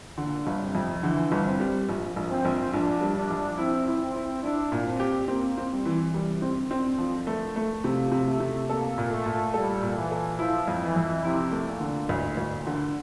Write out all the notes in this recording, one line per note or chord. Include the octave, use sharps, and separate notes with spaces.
A#2 D3
G1
C3
F2
D3 E3
G1
C4
G3
A#1
A#1
C4
A#1
A#1 D4
G3
D4
A#1
C4 E4
E4
C4
E4
D4 E4
A#2
C4
G4
A#3 C4
C4
G3
E3
C3 G3
C4
D3
C4
F3
A3
A3
C3 F3
C3
A3
C3
A#3 A4
A#2
A3
A#2
G3 A4
A#2
E3
A4
F3 E4
F2
E3
F2
C3 E4
A3
A#2
D3
D2 A2
D2
A#2
D3